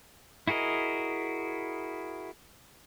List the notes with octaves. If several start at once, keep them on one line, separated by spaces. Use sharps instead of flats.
E4 F#4 G#4 A#4 D#5